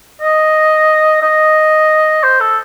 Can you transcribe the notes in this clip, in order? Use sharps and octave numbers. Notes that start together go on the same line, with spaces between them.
D#5
D#5
C5
A4